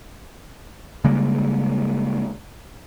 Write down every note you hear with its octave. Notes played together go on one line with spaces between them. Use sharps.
C#3 G3 G#3 A#3